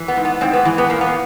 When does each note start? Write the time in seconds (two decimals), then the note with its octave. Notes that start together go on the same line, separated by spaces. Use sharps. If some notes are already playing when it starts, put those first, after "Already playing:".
Already playing: E3
0.08 B3
0.17 G#2
0.25 B3
0.41 G#2 C4
0.53 B3
0.65 E3
0.78 B3
0.90 A#2 A#3
1.01 B3